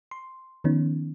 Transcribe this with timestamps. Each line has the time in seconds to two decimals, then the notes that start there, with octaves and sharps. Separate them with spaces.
0.11 C6
0.64 D#3 F3 B3 C#4 D#4